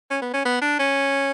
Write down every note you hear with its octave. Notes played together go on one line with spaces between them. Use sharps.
C#4
B3
C#4
B3
D4
C#4